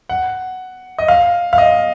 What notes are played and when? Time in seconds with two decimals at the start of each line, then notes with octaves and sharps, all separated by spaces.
0.10 F#5
0.98 D#5
1.08 F5
1.53 F5
1.58 D#5